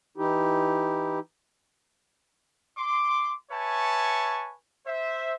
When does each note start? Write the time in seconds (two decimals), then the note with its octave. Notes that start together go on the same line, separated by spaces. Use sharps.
0.17 E3 D#4 E4 G4
2.78 C6 D6
3.51 B4 C#5 E5 G#5 A5 C#6
4.86 C5 E5